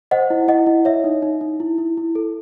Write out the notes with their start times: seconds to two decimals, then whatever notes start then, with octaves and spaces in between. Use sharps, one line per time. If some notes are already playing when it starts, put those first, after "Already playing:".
0.11 C5 D#5 F#5
0.30 E4
0.48 E4 D#5 F#5
0.67 E4
0.85 C#5 E5
1.04 D#4
1.22 D#4
1.41 D#4
1.60 E4
1.78 E4
1.97 E4
2.15 A4